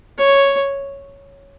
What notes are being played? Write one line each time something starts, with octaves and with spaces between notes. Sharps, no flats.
C#5